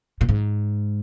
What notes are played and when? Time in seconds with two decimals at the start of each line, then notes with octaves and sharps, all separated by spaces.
0.21 A#2
0.29 G#2